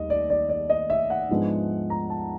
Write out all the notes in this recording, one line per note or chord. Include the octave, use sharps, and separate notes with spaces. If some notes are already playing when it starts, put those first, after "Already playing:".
Already playing: D#2 G3 D#5
D5
D5
D5
D#5
E5
F#5
G#2 F3 G#3 B3 D4
A#5
A5